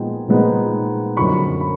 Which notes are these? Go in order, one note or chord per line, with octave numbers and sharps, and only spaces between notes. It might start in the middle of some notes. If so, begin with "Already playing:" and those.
Already playing: A#2 F3 G#3 B3 D#4 G5
A#2 F3 G#3 B3 D#4
F#2 D3 F3 B5 C#6
B5